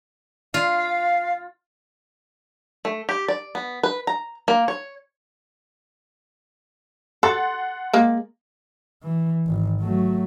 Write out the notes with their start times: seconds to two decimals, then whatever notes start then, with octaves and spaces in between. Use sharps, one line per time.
0.54 F4 F5
2.85 A3
3.09 G4
3.28 D5
3.55 B3
3.83 B4
4.07 A#5
4.48 A#3
4.68 C#5
7.23 A4 F#5 C6 A6
7.93 G#3 A#3
9.03 E3
9.46 G#1
9.81 F#3 A3